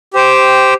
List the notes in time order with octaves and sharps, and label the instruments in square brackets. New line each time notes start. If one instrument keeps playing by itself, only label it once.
[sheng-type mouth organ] G4 C5 G5